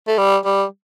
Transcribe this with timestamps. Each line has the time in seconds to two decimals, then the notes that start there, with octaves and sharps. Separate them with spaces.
0.08 A3
0.18 G3
0.45 G3